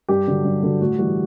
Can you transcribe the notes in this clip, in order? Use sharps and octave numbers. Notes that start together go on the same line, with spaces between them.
G2 G4
D3 F#3
G2
D3 F#3
A2 F#4
E3 G3 F#4